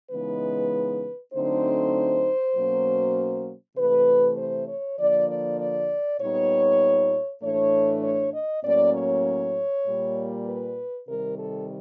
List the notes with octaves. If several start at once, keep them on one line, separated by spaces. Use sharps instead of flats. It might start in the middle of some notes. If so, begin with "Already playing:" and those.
C#3 E3 G#3 B3 D#4 B4
D3 F#3 A3 C4 D#4 C5
B2 F#3 A#3 C#4
C3 E3 A3 B4
C5
C#5
D3 F3 A#3 D5
D5
D5
A#2 G3 B3 D#4 C#5
A2 E3 A3 D4 C#5
C#5
D#5
A2 F#3 A#3 C#4 D5
C#5
A#2 G3 A#3
B4
C3 D#3 G3 A#4
A4